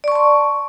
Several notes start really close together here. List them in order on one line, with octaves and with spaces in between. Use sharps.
D5 C#6 A5 C6